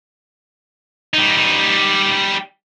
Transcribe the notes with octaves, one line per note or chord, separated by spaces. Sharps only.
G3 D#4